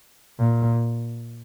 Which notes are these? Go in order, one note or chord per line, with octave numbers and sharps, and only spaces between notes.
A#2